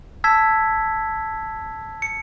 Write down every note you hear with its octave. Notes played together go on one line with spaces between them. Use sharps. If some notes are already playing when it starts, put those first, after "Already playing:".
A5 E6 G#6 B6
C#7